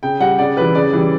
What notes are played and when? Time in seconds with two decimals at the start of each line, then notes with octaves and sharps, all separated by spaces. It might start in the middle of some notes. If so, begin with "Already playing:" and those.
0.03 C#3 G5
0.20 G3 F#5
0.38 C#3 D5
0.57 E3 G3 B4
0.75 C#3 D5
0.93 E3 G3